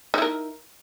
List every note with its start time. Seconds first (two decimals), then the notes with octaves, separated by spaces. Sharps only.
0.14 D#4
0.18 E4
0.22 A#4